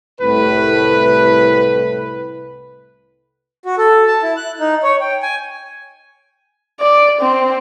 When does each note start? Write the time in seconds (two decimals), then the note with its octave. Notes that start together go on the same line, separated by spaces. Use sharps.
0.21 C2 A2 B4
3.65 F#4
3.78 A4
4.07 A5
4.22 E4
4.37 F#6
4.60 D#4
4.83 C#5
5.01 G5
5.22 G#5
6.80 D5
7.21 C4